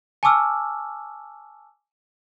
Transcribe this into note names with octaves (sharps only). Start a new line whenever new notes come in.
G#5 A5 C#6 D6 E6 F6